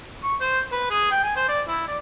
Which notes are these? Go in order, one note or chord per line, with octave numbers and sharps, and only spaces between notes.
C#6
C5
B4
G#4
G5
G#5
C5
D5
E4
D5